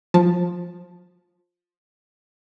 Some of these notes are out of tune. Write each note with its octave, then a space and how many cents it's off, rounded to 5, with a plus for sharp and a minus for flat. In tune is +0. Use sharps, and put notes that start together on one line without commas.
F3 +15 A5 +0